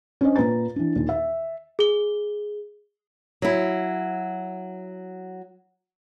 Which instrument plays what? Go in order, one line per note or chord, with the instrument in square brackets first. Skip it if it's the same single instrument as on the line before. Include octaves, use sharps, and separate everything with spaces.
[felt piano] C#4 D4 C5 C#5 D#5
A#2 B4 A#5 A6
E3 D4
D#2 A#2 D#3
E5
[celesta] G#4 G7
[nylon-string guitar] F#3 E4